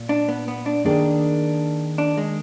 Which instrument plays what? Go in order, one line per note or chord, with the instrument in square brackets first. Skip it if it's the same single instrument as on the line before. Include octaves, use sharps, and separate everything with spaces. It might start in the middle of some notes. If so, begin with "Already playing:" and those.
Already playing: [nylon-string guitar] A#2
[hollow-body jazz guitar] D4
B3
B3
D4
[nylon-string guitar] D#3 A#3 D#4 G#4 [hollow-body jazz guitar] D4
[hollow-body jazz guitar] D4
G#3